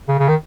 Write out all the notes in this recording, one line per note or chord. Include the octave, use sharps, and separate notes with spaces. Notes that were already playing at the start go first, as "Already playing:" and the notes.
C#3
C#3
D#3